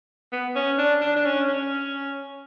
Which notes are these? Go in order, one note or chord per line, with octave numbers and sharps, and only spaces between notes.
B3
C#4
D4
D4
D4
C#4
C#4